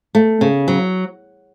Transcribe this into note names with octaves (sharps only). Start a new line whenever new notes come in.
A3
C#3
F#3